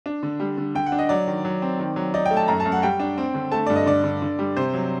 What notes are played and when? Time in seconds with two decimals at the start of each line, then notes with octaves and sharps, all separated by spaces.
0.06 D4
0.23 D3
0.40 G3
0.57 D3
0.75 D3 G5
0.86 F#5
0.92 D4
0.99 D#5
1.09 F#3 D5
1.27 D#3
1.45 F#3
1.62 C4
1.79 D#3
1.96 F#3
2.14 D#4 D5
2.26 G5
2.31 A3
2.37 A5
2.48 F#2 A#5
2.60 A5
2.65 F#2
2.72 F#5
2.83 G3 G5
3.00 D4
3.18 C4
3.34 D3
3.52 A3 A5
3.66 G2 D5
3.76 D#5
3.86 D3 D5
4.04 D3
4.22 D3
4.39 G3
4.56 C3 C5
4.73 F#3